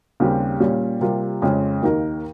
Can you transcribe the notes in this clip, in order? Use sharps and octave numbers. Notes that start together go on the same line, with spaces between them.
D#2 C#3 G3 C4 G4
A#2 G3 C#4
C3 G3 A#3 F4
F2 C#3 G#3 C#4
D#2 D#3 A#3 D#4 A#4